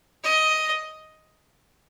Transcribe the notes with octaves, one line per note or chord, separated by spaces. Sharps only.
D#5